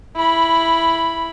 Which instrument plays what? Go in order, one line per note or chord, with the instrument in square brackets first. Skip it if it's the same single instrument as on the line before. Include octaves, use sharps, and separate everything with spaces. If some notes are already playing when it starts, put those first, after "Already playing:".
[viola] E4 B5